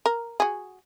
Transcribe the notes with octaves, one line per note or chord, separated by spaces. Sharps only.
A#4
F#4 G#4